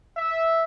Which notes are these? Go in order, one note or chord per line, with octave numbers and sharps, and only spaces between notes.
E5